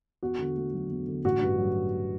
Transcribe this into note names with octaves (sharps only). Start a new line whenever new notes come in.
E2 F#4
D3
A3
F#3
E2
D3
A1 F#4
G2
F#3